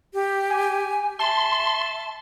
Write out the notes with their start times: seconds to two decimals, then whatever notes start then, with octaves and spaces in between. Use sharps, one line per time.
0.14 G4
0.50 G#5
1.19 E5 A5 C6